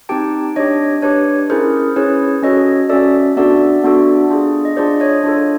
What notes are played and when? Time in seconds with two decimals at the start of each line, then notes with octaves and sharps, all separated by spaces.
0.09 C4 D#4 G4 G5 A5
0.56 D4 G4 C#5 D#5
1.02 D4 G4 B4 C#5
1.50 C#4 E4 G#4 A#4 C5
1.96 C#4 E4 G#4 B4 C#5
2.43 C#4 F#4 A4 C#5 D#5
2.89 C#4 F#4 A4 D5 E5
3.37 B3 D4 F#4 A4 D5 E5
3.84 B3 D4 F#4 A4
4.30 D4 F4 G#4
4.65 D#5
4.77 D4 F4 G#4 C5 D5
5.00 C#5 D#5
5.24 D4 F4 A4